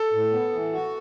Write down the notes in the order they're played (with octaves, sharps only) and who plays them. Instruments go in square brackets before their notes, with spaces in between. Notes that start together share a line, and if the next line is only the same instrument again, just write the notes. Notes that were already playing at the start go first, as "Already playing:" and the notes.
Already playing: [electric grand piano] A4
[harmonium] A2
B3
E3
F#4